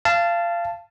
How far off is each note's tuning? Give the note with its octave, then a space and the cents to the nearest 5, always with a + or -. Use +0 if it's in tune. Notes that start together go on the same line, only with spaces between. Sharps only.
F5 -25 A5 +0